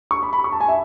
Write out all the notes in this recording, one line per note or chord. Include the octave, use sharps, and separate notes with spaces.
C#6
B5
B5
C#6
A5
G#5
E5